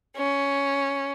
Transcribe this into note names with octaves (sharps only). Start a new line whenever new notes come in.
C#4